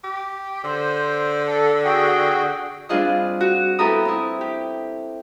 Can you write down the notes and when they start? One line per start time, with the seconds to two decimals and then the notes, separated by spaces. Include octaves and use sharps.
0.04 G4
0.64 D3 C5
1.46 A4
1.84 F#4 G#4 G5
2.89 G3 C4 D4 F4 G#4 D#5
3.41 F#4
3.79 B3 E4 G4 A4 A#5 D#6
4.05 C4 E4
4.41 G4